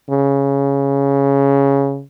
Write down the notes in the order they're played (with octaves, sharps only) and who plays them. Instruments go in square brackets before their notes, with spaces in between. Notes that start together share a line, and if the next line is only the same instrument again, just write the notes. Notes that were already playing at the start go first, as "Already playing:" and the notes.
[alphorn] C#3